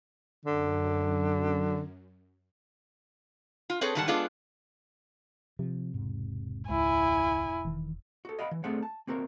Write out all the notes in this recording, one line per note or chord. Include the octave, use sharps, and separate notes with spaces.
F#2 D3
F4
C4 G#4 A4 B4 C#5
G#2 D#3 G3 D#4 F#5 A5
G#3 B3 D4 F4 G#4 A4
C3 F3
E1 G#2
C#2 E4 G#5
E1 D#3 E3
F#4 A4
D#5 F5 F#5 B5
E3
A3 C4 D4 G#4 A4 F#5
A5
A#3 C4 F#4 A#4